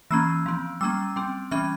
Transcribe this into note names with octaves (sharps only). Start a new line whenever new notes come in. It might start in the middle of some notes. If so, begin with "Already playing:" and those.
E3 A#3 C#4 E6
F3 C4
G3 A#3 C#4 E6
G3 C4
E3 G3 C#4 F6